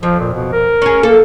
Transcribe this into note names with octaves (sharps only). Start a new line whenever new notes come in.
F2 F3
A#2
B2
A#4
C#4 G#4
A#3 A4